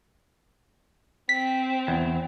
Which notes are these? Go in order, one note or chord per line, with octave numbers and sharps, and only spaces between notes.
C4 B6
E2